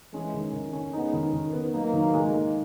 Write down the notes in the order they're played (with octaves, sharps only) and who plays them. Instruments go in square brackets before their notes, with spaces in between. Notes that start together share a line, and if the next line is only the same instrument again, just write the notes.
[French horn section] E3 G#3 [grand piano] C#4
[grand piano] D#3
D#3
C#4
[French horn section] G#3 B3 [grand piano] D#4
[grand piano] D#3
D#3
B3
[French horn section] F#3 A#3 [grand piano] D#4
[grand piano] D#3
G#3
D#4